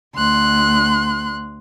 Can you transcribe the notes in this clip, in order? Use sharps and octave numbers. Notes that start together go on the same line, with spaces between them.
D2 C6 F#6